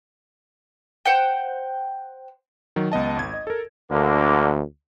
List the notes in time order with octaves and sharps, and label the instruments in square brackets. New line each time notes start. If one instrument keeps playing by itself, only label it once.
[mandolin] C5 F#5 G5
[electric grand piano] D#3 F#3
C#2 B3 D#5 A5
G#1 G#6
D#5
A4 A#4
[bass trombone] D2 [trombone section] D3 A#3